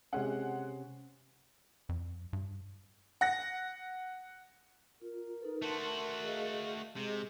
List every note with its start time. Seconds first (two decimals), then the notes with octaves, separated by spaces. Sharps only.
0.13 C3 G#3 C#4 F#5
1.89 F2
2.33 G2
3.21 F#5 A#6
5.02 F4 A#4
5.40 D#4 A4 B4
5.62 A3 F#4 A5 C6
6.23 G#4 D#5 F5
6.96 C3 G#3 G#4 D#5